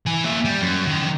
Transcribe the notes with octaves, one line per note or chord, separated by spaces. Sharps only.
E3 G#5
A#3 E5
G3
F#2
D3 D#3